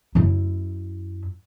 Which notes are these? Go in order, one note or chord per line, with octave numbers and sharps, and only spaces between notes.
F#2 E4